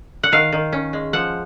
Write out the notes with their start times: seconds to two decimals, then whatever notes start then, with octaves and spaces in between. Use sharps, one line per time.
0.23 F#5
0.32 D#3 F5
0.53 D#3
0.72 C#4
0.93 G#3
1.13 F3 F#5